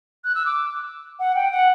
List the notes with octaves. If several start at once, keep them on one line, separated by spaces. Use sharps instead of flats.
F#6
E6
D6
F#5
G5
F#5